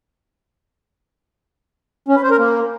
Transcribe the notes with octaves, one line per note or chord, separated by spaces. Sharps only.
C#4
B4
C5
A#4
A#3